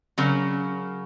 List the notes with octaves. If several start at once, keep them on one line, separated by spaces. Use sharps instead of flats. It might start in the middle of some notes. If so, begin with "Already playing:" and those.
C#3 F#3 C#4 A#4